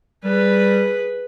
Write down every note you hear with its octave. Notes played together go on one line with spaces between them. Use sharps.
G3 G#4 B4